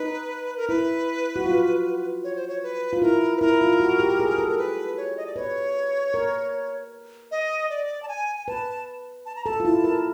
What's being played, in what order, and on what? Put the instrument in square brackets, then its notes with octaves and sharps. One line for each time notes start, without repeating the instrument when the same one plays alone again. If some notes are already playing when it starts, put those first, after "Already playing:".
Already playing: [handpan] D#4 [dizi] B4
[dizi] A#4
[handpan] E4 [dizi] B4
[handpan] F#4
F4
[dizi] C#5
C5
C#5
B4
[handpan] F4
[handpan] E4 [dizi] A#4
[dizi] B4
[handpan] E4 [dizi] A#4
[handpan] F4
F#4
G4
G#4
A4
[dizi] A#4
B4
C#5
D#5
D5
[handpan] B4 [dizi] C#5
[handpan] A#4
[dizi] D#5
D5
A5
G#5
G#5
[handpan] B4 [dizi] A5
[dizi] A5
A#5
[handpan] A4 [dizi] A5
[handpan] F4
[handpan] E4 [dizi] A5
[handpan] A#4